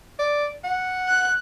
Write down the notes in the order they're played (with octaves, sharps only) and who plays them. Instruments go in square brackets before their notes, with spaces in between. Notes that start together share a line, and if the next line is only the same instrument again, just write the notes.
[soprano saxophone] D5
F#5
[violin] F#6